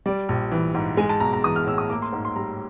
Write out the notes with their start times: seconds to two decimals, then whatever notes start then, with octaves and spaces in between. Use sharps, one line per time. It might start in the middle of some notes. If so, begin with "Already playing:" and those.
0.06 G3 D5
0.29 A#1
0.52 E3
0.74 G#2
0.97 G#3 G#5
1.09 A5
1.20 B1 A#5
1.33 A#5
1.44 E3 D#6
1.56 F6
1.67 A2 E6
1.78 D#6
1.89 A#3 D6
2.02 C6
2.13 G#2
2.25 C6
2.36 G3 A#5